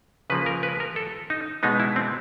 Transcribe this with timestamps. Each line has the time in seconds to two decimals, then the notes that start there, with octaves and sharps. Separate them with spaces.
0.30 C#3 F3 A#3 B4
0.46 A#4
0.63 B4
0.80 A#4
0.96 A4
1.30 D#4
1.63 B2 G#3 B3 D#4
1.80 E4
1.96 C4